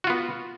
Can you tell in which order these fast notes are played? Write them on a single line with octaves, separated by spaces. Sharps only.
F#4 F4 B3